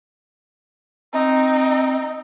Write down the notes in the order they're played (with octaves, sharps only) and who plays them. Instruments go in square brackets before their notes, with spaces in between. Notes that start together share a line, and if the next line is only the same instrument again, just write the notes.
[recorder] C4 [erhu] D#4